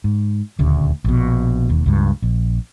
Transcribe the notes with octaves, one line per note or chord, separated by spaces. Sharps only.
G#2
D#1 D2 C#3
A#1 B2
E1 D#2
C#2 G2
A#1